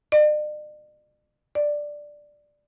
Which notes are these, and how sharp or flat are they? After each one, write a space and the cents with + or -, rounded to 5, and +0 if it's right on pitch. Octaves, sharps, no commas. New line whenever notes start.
D5 +45
D5 +5